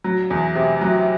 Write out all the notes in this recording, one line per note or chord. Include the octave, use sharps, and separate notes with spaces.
F#3
E2
C3
F#3